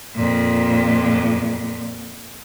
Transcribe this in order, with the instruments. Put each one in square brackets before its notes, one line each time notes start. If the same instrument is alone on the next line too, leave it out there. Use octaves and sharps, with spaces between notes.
[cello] F2 A#2